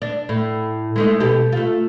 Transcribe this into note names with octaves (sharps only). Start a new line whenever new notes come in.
D4
A2
G#3 A3 D#4
B2 G4 A4
A3 F4